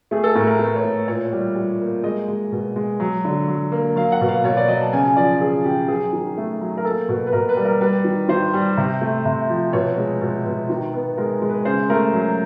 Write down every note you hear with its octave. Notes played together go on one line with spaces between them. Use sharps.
A3 G#4
A4
A2 A#4
A#4
A3 B4
C#5
A2
A#2 C#5
G3
G3
A#3
G#3 D#5
G#3
B2
G#3
F#3
D3
F#3
A#3
F#3 F5
F#5
B2
F5
B2 C#5
D5
F#3 D#5
A5
C#3 G#5
G#5
F3 D5
C#3 G#4
C#3 G4
F#3 G#4
D#3
A3
F#3
A#4
A#3 A4
B2
B4
B2 A#4
B4
G3
A#4
G3 B4
D#3
D#3 C5
G3
C3
A3
C3
F3
B2 C#5
G#3
B2
B2
D#3
B3
G#3 A#4
G#3
B4
C#3 C5
A3 A#4
F#3